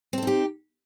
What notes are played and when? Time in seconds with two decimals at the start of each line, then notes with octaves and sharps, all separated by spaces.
0.13 C4
0.18 A4
0.22 D#4
0.27 G4